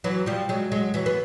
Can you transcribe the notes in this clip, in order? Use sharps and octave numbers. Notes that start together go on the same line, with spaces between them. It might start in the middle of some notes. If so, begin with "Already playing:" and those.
E3 F#3
F3 G3
F#3 G#3
F#3 G#3
E3 F#3
B3